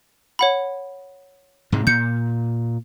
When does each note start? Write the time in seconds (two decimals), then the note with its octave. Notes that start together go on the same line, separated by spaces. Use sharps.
0.39 C#5 F#5 B5
1.72 G#2 C3 G#3
1.87 A#2 G6 C#7